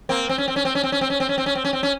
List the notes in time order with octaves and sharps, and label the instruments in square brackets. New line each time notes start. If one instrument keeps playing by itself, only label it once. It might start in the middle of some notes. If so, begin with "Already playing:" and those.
[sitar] A#3 C4
C4
C#4
C4
C#4
C4
C#4
C4
C#4
C4
C#4
C4
C#4
C4
C#4
C4
C#4
C4
C#4